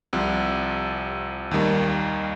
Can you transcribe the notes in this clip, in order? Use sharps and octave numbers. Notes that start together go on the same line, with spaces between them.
C2 C3 F3
D#2 D#3 G3 A#3